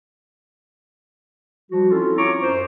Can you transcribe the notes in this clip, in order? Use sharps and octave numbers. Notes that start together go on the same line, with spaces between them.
F3 G3 F#4
C4 C#4 E4 F4 A4
F4 C#5 A#5 C#6 D6
F#2 C5